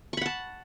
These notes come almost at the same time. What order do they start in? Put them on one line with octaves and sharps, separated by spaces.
C#6 B5 F#5 A5